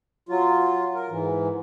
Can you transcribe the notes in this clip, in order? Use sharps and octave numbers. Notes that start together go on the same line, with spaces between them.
F#3 F4
A#4
G#2 E3